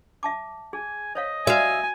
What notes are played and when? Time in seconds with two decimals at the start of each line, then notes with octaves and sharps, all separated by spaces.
0.23 E5 A5 D6
0.73 G#4 G#5
1.15 C5 C#5 D#5 F5
1.47 F#4 E5 F5 G#5